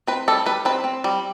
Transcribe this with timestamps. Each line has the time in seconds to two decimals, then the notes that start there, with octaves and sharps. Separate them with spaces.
0.07 C4 B4
0.28 G3 A4
0.46 G3 B4
0.65 C4 B4
0.84 C4
1.04 G3